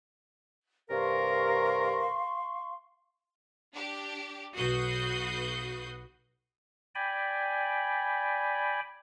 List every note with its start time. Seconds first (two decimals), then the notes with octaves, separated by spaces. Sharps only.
0.90 G2 C3 A#4 F5 C6 C#6
3.74 D4 G4
4.55 B1 F#4 B4 D#6 G6 C7
6.95 D5 G5 G#5 B5